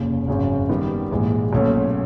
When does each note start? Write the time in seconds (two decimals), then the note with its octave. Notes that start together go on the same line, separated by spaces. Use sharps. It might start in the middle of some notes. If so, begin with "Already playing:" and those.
Already playing: F1 D#2 C#3
0.28 G#1 F#2 C#3
0.69 D#3 G3 B3
1.11 A#1 G#2 E3 G#3
1.53 B1 A#2 F#3 A3 C#4